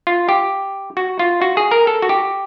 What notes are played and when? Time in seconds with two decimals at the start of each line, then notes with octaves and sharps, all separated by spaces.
0.07 F4
0.29 G4
0.97 F#4
1.19 F4
1.42 F#4
1.57 G#4
1.71 A#4
1.87 A4
2.02 F#4
2.09 G4